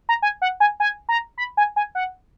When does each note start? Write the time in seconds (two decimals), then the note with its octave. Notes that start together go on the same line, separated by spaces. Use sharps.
0.09 A#5
0.22 G#5
0.42 F#5
0.60 G#5
0.80 G#5
1.09 A#5
1.38 B5
1.57 G#5
1.76 G#5
1.95 F#5